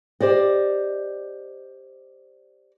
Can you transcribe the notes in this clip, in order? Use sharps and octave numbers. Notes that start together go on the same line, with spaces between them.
G4 C5 D5 D#5